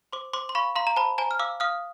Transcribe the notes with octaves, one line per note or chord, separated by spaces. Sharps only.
C5 C6 D6
C5 C6 D6
C6
F5 B5 C#6
F5 A#5 C6
A#5
C5 A5 B5
C5 G#5 A#5
F6
F5 D6 E6
F5 D#6 F6